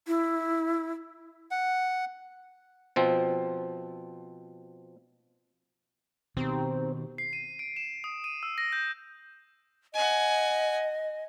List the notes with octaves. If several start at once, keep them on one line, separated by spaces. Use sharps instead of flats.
E4
F#5
B2 F3 C4
B2 D#3 C4 D#4 G4 A#5
C7
D#7
D7
E7
D#6
D#7
E6
A#6
G6
D#5 F#5 G#5